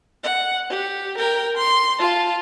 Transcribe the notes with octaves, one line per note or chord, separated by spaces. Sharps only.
F#5
G4
A#4 G5
C6
F4 A5